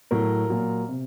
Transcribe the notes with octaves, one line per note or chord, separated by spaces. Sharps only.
A2 F#3 A#4
A#2 F#3
C3